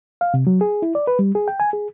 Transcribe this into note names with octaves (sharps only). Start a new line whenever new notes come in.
F5
C3
F#3
G#4
E4
D5
B4
G3
G#4
G5
G#5
G#4